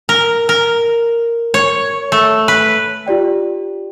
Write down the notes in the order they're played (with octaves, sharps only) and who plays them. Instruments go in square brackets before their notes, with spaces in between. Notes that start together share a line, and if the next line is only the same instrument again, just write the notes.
[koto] A#4
A#4
C#5
A3
B4
[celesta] F4 G4 D5 G5